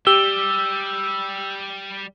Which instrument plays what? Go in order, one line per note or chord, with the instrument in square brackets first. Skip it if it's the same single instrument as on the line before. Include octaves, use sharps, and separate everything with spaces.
[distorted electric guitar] G3 [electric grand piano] G4 [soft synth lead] E6 [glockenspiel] G7